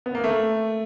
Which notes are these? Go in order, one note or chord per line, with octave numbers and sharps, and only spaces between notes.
B3
A#3
A3